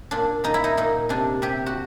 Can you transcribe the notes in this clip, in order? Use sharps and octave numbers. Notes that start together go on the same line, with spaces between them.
A#2 D4
A#2 D#4
E4
D#4
A#2 D#4
C3 D4
C3 G4
F#4